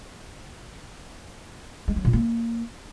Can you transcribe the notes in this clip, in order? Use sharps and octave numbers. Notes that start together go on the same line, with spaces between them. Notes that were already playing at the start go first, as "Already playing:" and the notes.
G#3
F#3
A#2
A#3